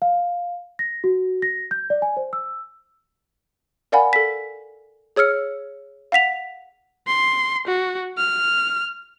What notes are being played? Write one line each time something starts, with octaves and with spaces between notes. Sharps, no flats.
F5
A#6
F#4
A#6
G6
D5
G#5
C5
E6
A#4 D5 F5 F#5 G#5 B5
A4 B6
G#4 C#5 E6 F6 C#7
F5 F#5 B6 F7
C6
F#4
F6